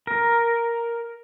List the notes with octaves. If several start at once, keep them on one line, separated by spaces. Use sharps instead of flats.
A#4